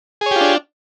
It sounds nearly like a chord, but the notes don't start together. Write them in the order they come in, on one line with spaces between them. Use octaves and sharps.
G#4 C#5 G4 F4 D4